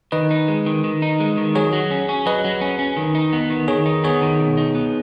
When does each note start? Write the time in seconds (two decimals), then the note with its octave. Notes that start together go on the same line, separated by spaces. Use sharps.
0.12 D#3 B4 D#5
0.31 D#4
0.48 G#3
0.66 D#3
0.84 D#3
1.02 D#4
1.20 G#3
1.37 D#3
1.55 F#3 G#4 C#5
1.73 F#3
1.91 C#4
2.09 C#4
2.26 F#3 B4 D#5
2.44 F#3
2.61 C#4
2.79 C#4
2.97 D#3
3.15 D#4
3.33 B3
3.50 D#3
3.68 D#3 G#4 C#5
3.86 D#4
4.04 B3 G#4 C#5
4.22 D#3
4.40 B2
4.57 D#4
4.75 B3